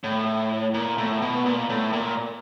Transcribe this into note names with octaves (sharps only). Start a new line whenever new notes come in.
A2
A#2
A2
B2
A#2
A2
A#2